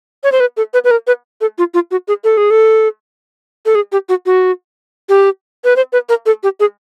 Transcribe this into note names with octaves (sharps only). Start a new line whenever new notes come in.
C#5
C5
B4
A4
B4
B4
A#4
B4
A4
F4
F4
F#4
G#4
A4
G#4
A4
A4
G#4
G4
F#4
F#4
G4
B4
C5
B4
A#4
A4
G4
G#4